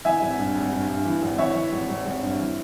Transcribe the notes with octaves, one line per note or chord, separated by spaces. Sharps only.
E3 E5 G#5
G#1
G2
G#1
G2
G2
E3
G#1
E3 C#5 E5
E3
G#1
G#1
G#1
G2
E3